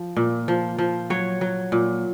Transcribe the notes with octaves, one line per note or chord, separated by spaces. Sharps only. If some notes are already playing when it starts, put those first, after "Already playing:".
Already playing: F3
A#2
F3
F3
F#3 C#5
F#3
A#2